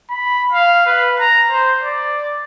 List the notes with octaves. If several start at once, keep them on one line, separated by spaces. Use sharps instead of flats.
B5
F5
B4
A#5
C5
D5